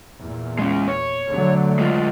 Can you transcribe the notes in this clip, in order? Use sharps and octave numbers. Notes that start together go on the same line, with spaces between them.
E2 A#2
G#3 C#4
C#5
D3 F#3 A3
G#3 F4